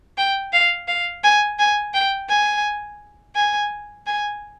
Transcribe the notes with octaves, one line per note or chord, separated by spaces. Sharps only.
G5
F5
F5
G#5
G#5
G5
G#5
G#5
G#5